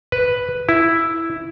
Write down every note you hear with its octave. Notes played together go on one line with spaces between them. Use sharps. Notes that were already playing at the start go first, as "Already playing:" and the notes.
B4
E4